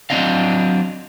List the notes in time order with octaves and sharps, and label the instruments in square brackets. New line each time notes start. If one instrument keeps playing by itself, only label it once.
[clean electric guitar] F#3 B3 C4 D4 D#5 F5